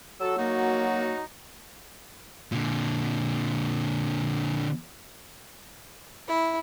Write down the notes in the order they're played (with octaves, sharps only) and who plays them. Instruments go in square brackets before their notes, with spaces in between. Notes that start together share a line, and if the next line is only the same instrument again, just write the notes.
[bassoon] F#3 [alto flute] F#4 [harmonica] A4 E6
[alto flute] A#3 [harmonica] D#4 F#4
[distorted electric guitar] A#2 D3
[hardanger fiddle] E4